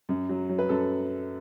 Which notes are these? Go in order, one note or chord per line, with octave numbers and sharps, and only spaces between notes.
F#2
F#3
F#3
B4
F#2 A4